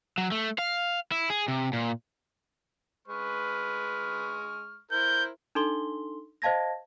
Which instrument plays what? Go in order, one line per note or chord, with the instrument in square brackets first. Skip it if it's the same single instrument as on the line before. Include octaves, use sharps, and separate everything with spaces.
[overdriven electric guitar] F#3
A3
F5
E4
G#4
C3
A#2
[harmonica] G#3 C#6 F6 [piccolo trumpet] B4
[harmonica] E4 A#4 C5 [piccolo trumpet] G6
[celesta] D4 D#4 A4 C6 G7
C5 D#5 F5 A5 G#6 A#6